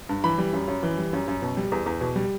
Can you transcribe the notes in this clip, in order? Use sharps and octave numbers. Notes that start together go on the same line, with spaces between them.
G2
E3 B5
G3
F#2
F#2
E3
G3
F#2
F#2
B2
G3
E2
E2
B2
G3